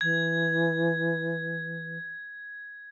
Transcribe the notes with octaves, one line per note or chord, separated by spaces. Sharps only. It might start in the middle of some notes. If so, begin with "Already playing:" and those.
E3 G#6